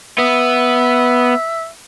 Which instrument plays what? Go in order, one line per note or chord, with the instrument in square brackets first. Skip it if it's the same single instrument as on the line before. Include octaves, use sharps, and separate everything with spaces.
[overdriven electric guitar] B3 [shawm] E5